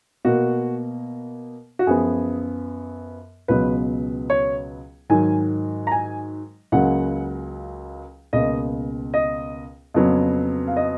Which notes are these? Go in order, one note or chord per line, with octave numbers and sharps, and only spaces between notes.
B2 A#3 F#4
F#4
F#2 F3 B3 G#4
C#2 B2 F#3 B3 B4
C#5
G#2 D#3 F#3 G#5
A#5
G#5
C#2 C#3 F#3 A#3 F#5
C#2 B2 A#3 D#5
D#5
F2 C#3 F#3 B3
F5
D#5